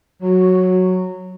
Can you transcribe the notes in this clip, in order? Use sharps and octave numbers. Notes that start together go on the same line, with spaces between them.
F#3 F#4